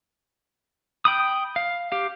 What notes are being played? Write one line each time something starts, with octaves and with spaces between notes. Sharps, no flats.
G5 B5 D#6
F5
G4 F5